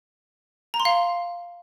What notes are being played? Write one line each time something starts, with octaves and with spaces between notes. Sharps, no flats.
A#5
C6
F5